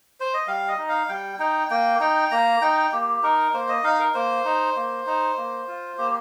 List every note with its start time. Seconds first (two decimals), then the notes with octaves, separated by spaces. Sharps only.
0.20 C5
0.34 D#5
0.47 G3 F5
0.68 D#5
0.78 D#4
0.89 F5
1.09 G3 G5
1.39 D#4 G5
1.70 A#3 G5
2.00 D#4 G5
2.31 A#3 A#5
2.61 D#4 G5
2.92 A#3 G4
3.23 D#4 A#4
3.53 A#3 C5
3.69 D#5
3.84 D#4 F5
3.99 A#4
4.14 A#3 C5
4.45 D#4
4.76 A#3
5.07 D#4
5.37 A#3
5.68 F4
5.98 A#3 G4